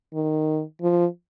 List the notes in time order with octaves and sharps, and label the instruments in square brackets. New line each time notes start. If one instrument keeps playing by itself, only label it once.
[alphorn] D#3
F3